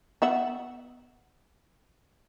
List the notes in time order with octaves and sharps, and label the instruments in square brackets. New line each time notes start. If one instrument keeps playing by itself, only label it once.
[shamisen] B3 E5 F#5